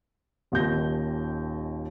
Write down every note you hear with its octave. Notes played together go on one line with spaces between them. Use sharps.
D#1 D#2 D#3 G6 A#6